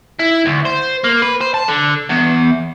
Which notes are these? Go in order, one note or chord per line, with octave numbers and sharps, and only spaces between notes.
E4
D2
C5
A#3
B4
C5
A5
D3
E2